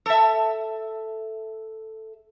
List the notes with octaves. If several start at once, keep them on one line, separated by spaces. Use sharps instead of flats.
A4 E5